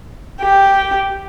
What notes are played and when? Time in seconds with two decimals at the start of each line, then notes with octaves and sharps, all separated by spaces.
0.41 G4